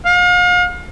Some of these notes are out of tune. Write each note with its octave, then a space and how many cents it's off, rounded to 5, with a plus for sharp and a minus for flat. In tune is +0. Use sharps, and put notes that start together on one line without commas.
F5 +40